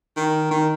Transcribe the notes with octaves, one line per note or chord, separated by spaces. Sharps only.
D#3
D#3